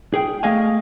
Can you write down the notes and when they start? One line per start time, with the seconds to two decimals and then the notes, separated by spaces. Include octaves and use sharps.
0.14 G#4 G5
0.43 A3 G#4 D#5 F5 G#5